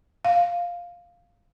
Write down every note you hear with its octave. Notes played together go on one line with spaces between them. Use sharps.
F5